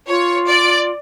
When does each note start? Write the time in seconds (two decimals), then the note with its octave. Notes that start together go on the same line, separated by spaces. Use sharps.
0.08 F4 C#5
0.48 D5